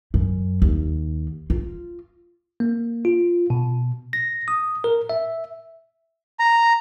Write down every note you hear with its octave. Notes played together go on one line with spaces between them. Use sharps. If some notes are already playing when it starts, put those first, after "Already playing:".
F#2
D#2
F4
A#3
F4
B2
A#6
D#6
A#4
E5
A#5